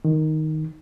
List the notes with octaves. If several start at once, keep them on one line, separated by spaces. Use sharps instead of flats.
D#3